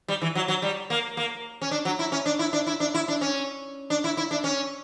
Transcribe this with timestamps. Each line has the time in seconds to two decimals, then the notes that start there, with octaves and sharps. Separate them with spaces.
0.08 G3
0.22 E3
0.35 F#3
0.48 F#3
0.62 G3
0.90 A#3
1.17 A#3
1.62 C#4
1.71 D4
1.85 F#3
1.99 E4
2.12 C#4
2.26 D4
2.39 E4
2.53 D4
2.67 E4
2.80 D4
2.94 E4
3.08 D4
3.21 C#4
3.90 D4
4.04 E4
4.17 E4
4.31 D4
4.44 C#4